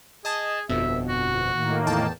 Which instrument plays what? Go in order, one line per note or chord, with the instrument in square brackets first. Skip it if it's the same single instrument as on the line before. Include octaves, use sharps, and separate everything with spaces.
[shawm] G#4 [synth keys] D#5 A5
[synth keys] G1 F2 B2 [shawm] E5
[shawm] F#4
[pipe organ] A2 D#3 A#3
[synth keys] E2 G5 A5